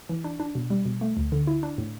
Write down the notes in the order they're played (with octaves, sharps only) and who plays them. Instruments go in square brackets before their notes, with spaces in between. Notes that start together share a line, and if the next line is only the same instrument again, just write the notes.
[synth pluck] E3
D4
D4
B2
G3
B2
A3
D2
D3
E4
D4
A2